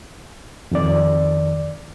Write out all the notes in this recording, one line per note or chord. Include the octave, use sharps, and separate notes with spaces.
F2 D#3 D5